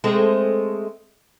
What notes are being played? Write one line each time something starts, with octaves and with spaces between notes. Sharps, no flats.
G#3 A3 C4